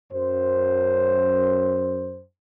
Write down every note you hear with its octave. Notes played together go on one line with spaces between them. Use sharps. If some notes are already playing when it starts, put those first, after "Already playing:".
F#2 C5